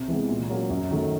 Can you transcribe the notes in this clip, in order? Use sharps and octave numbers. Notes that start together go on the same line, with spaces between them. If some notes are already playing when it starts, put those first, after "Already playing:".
Already playing: C3
E3 G#3 B3
A#2
F#3 A#3 C#4
F#2
D#3 F#3 A3